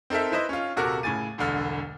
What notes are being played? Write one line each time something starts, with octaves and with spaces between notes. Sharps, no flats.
C4 D#4 A4 A#4 E5
E4 B4 C5 D#5 E5
C#4 F4
D#1 C3 F#4 A4 A#4 D6
A2 C#3 G#5 A6 D#7
E1 C2 D3 F6